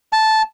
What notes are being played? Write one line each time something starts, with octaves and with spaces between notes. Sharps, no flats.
A5